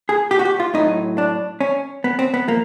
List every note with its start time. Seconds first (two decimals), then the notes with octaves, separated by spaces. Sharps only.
0.09 G#4
0.31 G4
0.39 F#4
0.45 G4
0.60 F4
0.74 A2 F#3 D#4
1.18 D4
1.61 C#4
2.04 B3
2.19 C4
2.34 B3
2.48 F3 A#3